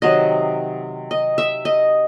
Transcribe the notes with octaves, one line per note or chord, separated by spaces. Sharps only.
C3 D#3 F#3 D#5
D#5
E5
D#5